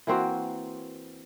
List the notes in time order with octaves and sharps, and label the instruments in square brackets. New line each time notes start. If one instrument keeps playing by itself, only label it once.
[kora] E3 A#3 C4 F#4